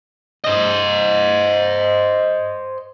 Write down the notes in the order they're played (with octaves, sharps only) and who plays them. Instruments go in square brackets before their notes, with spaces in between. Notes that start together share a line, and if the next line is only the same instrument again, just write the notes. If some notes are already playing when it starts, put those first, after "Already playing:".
[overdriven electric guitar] C5 D#5